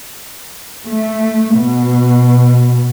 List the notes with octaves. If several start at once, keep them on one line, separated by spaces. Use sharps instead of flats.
A3
B2